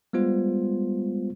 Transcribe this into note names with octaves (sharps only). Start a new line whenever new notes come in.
G3 G#3 B3 F4 C5